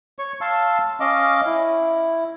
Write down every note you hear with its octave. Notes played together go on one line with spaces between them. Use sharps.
C#5 C#6
F5 A5 C6 E6
C#4 D#5 F5 D6
E4